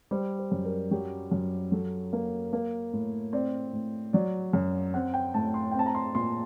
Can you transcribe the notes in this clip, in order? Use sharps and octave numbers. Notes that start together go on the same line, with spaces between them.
G3 C5
C5
F#2
A#4
F#3 G4
F#2
F#3 A4
A#3
A#3 A#4
A2
C4 D5
A2
F#3 D5
F#2
C4 F#5
G5
A2 A5
C6
G5
C4 A5
A#5
C6
A#2 C6